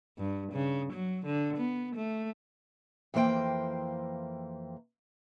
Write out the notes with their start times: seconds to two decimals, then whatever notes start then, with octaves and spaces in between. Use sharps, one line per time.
0.18 G2
0.53 C#3
0.92 F#3
1.26 D3
1.57 B3
1.95 A3
3.14 F2 E3 A#3 C5 G5